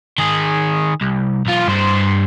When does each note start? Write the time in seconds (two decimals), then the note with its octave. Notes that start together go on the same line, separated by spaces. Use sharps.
0.18 D#3 G#4
1.01 C2
1.47 B1 F4
1.67 G2 C5